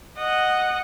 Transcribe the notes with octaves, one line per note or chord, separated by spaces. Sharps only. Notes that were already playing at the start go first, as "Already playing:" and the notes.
D#5 F#5